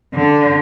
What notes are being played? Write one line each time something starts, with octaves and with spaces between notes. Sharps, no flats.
D3